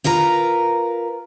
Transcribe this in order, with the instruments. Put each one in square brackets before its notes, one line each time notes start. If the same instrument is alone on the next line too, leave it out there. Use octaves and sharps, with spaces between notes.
[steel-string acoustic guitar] F4 A#4 B4 A#5